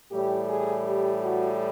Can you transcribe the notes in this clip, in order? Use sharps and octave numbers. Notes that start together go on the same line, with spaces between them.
A2 E3 G3 G4
G#4
G4
F#4